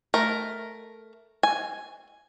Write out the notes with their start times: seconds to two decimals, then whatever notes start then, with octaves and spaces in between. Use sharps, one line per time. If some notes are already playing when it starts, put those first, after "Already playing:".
0.14 A3 A#4
1.43 G#5